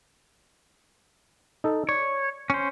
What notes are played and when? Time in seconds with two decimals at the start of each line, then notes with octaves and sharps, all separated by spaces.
1.64 D#4 A4
1.89 C#5 D5
2.50 C#4 C5